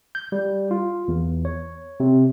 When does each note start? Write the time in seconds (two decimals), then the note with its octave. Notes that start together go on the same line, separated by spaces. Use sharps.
0.15 G6
0.32 G3
0.71 F4
1.08 E2
1.45 C#5
2.00 C3